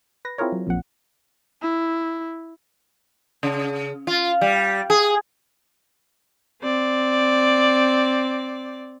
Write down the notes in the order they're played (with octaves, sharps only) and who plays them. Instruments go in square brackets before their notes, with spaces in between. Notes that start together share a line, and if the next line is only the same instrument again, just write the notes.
[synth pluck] B4 A#6
C4 E4 F4 G#4 A#4 C#5
F#3
A#1 F2 A#2 F#5
[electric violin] E4
[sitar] C#3
F4
G3
G#4
[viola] C4 D5